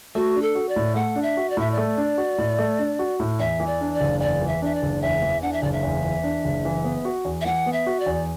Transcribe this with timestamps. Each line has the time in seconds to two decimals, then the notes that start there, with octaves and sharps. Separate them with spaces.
0.15 A3 F#4
0.35 D4
0.42 A4
0.55 F#4
0.69 D5
0.76 A2
0.95 A3 F#5
1.16 D4
1.23 E5
1.37 F#4
1.50 D5
1.57 A2 E5
1.71 D5
1.78 A3
1.98 D4
2.18 F#4
2.38 A2
2.59 A3
2.79 D4
2.99 F#4
3.20 A2
3.40 E2 E5
3.60 E3
3.67 D5
3.81 D4
3.94 D5
4.01 F#1
4.20 E2 D5
4.42 E3
4.47 E5
4.62 D4 E5
4.75 D5
4.82 F#1
5.02 E2 E5
5.22 E3
5.42 D4 F#5
5.53 E5
5.63 F#1 D5
5.72 E5
5.83 E2
6.04 E3
6.23 D4
6.45 F#1
6.65 E3
6.84 B3
7.05 F#4
7.25 E2
7.41 E5
7.45 E3 F#5
7.66 B3
7.73 E5
7.86 F#4
8.00 D5
8.06 E2